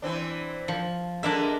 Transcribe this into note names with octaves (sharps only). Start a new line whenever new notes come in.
E3 C4 D4
F3
D3 G#3 A#3 D4 A#4 E5